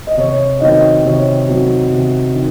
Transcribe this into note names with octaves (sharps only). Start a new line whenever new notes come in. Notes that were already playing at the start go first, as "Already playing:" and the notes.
D#5
C3 C#5
D#3 F#3 C4 D#5
C3 C#5
D#3 F#3 C4
C3
D#3